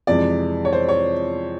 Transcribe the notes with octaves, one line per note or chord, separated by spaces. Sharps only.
F2 C3 E3 G#3 D5
C#5
C5
C#5